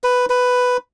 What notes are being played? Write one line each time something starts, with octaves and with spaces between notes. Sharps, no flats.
B4
B4